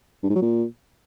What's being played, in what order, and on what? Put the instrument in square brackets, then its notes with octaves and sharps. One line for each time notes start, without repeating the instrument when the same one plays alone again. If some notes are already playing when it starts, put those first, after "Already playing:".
[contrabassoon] G2
G#2
F#3
A#2